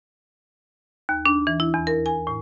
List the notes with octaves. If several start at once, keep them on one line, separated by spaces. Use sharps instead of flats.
D#2
D4
E3
E4
E2
A#4
G#5
A2